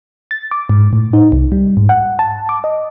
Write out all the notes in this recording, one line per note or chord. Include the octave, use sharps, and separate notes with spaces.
A6
D6
G#2
A2
D#4
C2
G3
G#2
F#5
A5
D6
D#5